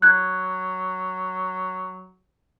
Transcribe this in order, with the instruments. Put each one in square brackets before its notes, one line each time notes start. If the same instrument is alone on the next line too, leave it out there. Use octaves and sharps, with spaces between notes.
[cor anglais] F#3 [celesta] F#6 G#6